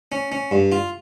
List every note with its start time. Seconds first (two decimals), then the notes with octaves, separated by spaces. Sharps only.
0.12 C#4
0.32 C#4
0.51 G2
0.72 F4